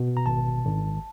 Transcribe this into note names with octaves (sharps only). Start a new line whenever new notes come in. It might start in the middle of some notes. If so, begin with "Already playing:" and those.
Already playing: B2
A#5
G#1 A5
G#1